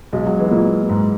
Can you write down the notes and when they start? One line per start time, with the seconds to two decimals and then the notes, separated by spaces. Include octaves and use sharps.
0.13 B1 G#3
0.26 F#3
0.39 E3 G#3
0.51 A#2 A#3
0.89 G#2